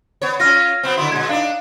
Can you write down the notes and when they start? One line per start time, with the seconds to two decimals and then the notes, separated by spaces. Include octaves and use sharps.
0.22 B3 C#5
0.40 C#4 F4 F6 A#6
0.83 F#3 B3 C4
0.97 D3 F#3 E4 C6
1.12 A#2 G#3 G#6
1.29 D4 D#4 F5